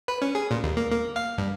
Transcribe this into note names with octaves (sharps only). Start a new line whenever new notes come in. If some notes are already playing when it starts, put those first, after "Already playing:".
B4
C#4
G#4
A#2
D#2
A#3
A#3
F5
G2